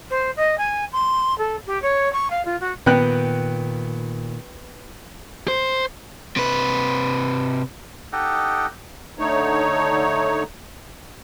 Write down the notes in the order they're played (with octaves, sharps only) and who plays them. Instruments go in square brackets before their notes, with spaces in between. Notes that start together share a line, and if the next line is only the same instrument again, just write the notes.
[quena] C5
D#5
G#5
C6
A4
G4
C#5
C#6
F5
F4
F#4
[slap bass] A#2 D#3 [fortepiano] B3 G5 F#6
[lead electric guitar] C5
[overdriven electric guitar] C3 B4
[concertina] D#4 G4 A4 D#5 F#5 G5
[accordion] D3 A3 D#4 C#5